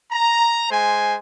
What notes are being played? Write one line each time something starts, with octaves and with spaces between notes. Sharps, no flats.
A#5
G#3 C5 G#5